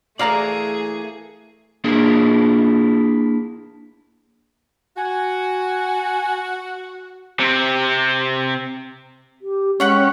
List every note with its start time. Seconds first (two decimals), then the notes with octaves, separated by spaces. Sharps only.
0.19 E3 A3 A#3 G#4 D5 F5 A#5
1.84 A#3 D4 E4 G#4 A#4
4.97 F#4 G#5
7.40 C3 C4
9.41 G4
9.80 G#3 C#4 B4 F#5 G5